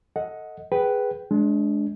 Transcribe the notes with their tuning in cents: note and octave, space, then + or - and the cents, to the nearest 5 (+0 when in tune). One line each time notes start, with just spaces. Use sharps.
A4 +20 D#5 +15 F#5 -10
G#4 +0 B4 +0 G5 -25
G#3 +30 D4 -15